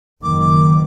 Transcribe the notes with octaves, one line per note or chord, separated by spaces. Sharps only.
F#1 D#3 D6